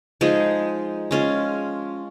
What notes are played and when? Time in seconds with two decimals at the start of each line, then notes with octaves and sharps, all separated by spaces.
0.21 F3 G#3 D#4 G#4
1.11 G#3 C#4 F4